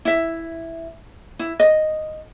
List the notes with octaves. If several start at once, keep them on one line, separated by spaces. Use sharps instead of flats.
E4 E5
E4
D#5